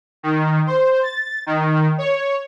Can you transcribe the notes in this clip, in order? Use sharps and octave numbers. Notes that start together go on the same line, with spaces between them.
D#3
C5
A6
D#3
C#5